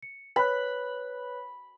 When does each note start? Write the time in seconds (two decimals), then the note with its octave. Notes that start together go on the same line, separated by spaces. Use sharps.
0.02 C#7
0.36 B4 C#5 B5 F#6